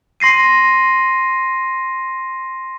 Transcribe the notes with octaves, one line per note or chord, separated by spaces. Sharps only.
C6 A#6 C7 D#7